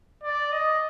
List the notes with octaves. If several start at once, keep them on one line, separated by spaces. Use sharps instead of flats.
D5
D#5